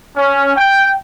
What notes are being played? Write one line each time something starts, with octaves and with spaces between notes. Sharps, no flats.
C#4
G5